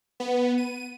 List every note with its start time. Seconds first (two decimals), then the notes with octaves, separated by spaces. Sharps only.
0.20 B3
0.58 D#7